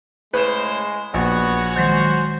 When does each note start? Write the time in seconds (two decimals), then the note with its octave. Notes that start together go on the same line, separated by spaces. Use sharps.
0.34 A2 C#3 G#3 B4 C5
1.14 A#1 B3 C#4 F#4
1.76 D#3 F#3 G#3 C5